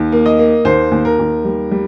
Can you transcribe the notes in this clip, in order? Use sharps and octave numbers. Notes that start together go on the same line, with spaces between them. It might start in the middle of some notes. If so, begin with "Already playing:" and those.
Already playing: D#2
A#3
D#5
A#3
D#2 C5
D#2
A#4
D#2
G3
G3